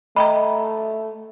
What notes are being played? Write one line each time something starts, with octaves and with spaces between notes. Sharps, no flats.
A3 D#5 G5 A#5 B5